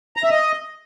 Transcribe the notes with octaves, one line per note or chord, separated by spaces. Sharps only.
A#5
E5
D#5